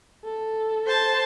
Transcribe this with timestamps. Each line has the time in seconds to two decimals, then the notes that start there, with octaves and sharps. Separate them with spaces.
0.25 A4
0.86 C5 A5